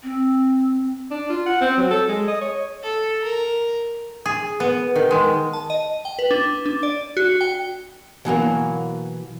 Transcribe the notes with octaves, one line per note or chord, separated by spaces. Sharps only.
C4
D4
F4
F#5
C4
F#3
A4
G#3
D#5
C#5
A4
A#4
G#4
B3
D#3
G#3
A5
D#5
G5
B4
D4
D4
D5
F#4
G5
B2 E3 F#3 A#3